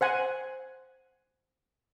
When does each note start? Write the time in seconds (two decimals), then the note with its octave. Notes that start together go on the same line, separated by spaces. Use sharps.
0.01 C5 F#5 G#5